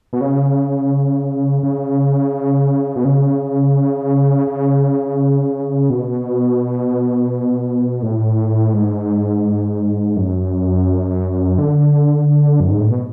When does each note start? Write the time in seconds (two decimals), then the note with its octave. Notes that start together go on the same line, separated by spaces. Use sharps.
0.13 B2
0.21 C#3
1.63 C#3
2.96 B2
3.05 C#3
4.47 C#3
5.90 B2
8.02 A2
8.73 G#2
10.16 F#2
11.58 D3
12.60 F#2
12.70 G#2
12.81 A2
12.91 B2